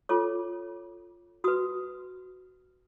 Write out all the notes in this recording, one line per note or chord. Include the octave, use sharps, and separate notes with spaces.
F4 A4 C#5 D6
F#4 B4 D#6